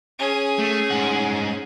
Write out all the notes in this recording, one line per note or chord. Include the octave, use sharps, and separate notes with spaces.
C#4 G#4
A3
G#2 F#5